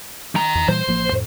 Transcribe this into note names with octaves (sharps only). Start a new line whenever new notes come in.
D#3 A#5
E2
A#2 E3 G3 C5
A1 F3 A#3
F2 A2